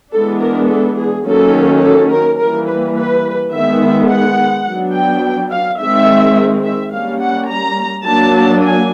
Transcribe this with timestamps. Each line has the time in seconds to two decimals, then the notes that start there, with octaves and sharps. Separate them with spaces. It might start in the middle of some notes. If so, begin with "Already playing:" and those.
0.13 E3 G#3 B3 D4 A4
0.41 A#4
0.70 A4
0.98 G#4
1.26 D#3 F#3 A#3 C#4 A4
1.83 A4
2.11 A#4
2.39 E3 G3 A#3 A#4
2.68 B4
2.96 B4
3.52 D#3 G#3 B3 E5
4.09 F#5
4.66 F#3 B3 D4
4.94 G5
5.51 F5
5.79 D#3 G#3 C4 E5
6.64 E5
6.92 G3 A#3 C#4 F5
7.20 F#5
7.49 A#5
8.06 F#3 A#3 D4 A5
8.63 G#5